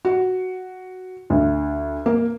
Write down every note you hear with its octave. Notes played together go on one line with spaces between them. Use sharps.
F#4
D2
A#3